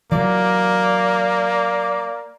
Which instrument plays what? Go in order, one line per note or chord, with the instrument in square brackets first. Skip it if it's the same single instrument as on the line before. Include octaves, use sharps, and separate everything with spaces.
[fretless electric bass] E3 F#3 [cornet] A#3 [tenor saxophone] D5